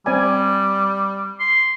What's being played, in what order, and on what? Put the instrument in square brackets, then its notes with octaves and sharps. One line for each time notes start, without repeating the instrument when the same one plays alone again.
[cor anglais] G3 [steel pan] C4 D5 G#5
[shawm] C6